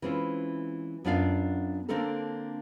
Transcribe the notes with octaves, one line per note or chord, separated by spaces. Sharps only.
E3 G#3 C4 C#4 F4
F#2 B3 D4 F4 D5 F5
D3 A#3 C4 D4 A4 A#4